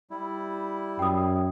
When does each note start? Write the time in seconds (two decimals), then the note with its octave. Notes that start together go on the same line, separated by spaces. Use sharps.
0.10 G3 E4
0.99 F#2 G5 D#6